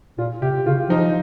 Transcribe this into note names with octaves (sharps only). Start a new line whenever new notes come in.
A#2 F4
C3 G4
C#3 F4
F3 D#4